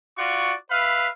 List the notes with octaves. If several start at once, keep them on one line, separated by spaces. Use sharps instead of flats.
F4 F#4 D5 C#6
B4 E5 F5 B5